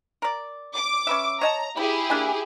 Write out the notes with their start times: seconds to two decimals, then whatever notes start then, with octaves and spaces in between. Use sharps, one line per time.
0.22 A#4 D5
0.76 D6
1.07 C#4 B4 E5
1.41 C#5 D#5 A5 A#5
1.77 E4 G4 G#4 B5
2.10 A#3 D4 G#5